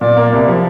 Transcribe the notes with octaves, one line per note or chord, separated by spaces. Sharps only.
A#2 D5
A#3
C2
F3